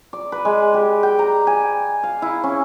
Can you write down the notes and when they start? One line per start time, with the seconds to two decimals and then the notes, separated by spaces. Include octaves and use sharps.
0.13 D5
0.32 B4
0.45 G#3
0.74 G4
1.03 G5
1.19 A#5
1.47 G#5
2.03 F5
2.22 E4
2.44 C#4